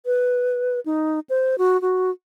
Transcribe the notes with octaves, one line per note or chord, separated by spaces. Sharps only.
B4
D#4
C5
F#4
F#4